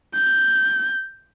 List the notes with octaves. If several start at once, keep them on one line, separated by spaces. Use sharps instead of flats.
G6